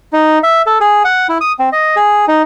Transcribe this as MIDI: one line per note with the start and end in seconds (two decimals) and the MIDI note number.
0.13 0.39 63
0.43 0.62 76
0.66 0.78 69
0.80 1.03 68
1.04 1.27 78
1.29 1.38 64
1.41 1.52 87
1.59 1.69 60
1.72 1.96 75
1.96 2.25 68
2.28 2.42 63